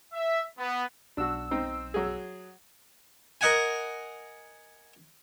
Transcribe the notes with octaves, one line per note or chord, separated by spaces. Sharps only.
E5
B3
B1 D4 F#4 E6
C4 D#4 C5
F#3 G#4
A#4 D#5 F#5 G#5